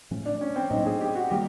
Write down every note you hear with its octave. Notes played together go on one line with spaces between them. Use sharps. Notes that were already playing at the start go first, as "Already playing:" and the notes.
A2 F3 A3 C#4
D4
C#4
C4
A2 F#3 A#3 D4 D#4
G#4
G4
F#4
D#3 G3 A#3 G4